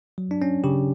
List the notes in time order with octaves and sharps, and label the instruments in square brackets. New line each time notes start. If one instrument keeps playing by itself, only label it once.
[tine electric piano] F#3
D4
C#4
C#3 G4